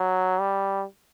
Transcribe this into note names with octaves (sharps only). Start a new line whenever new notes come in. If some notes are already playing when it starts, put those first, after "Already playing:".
Already playing: F#3
G3